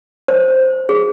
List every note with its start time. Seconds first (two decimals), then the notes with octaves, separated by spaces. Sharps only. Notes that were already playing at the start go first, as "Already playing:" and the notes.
0.28 C5
0.89 G#4